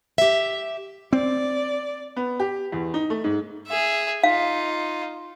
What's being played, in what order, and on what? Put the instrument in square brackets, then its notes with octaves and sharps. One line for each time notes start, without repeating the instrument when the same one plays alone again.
[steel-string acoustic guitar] G4 E5
[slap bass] C4 [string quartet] D5
[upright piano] B3
G4
E2
D#4
A3
G#2
[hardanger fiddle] G#4 E5
[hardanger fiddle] D#4 F4 [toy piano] F5